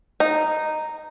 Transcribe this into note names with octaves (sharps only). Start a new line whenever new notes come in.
D#4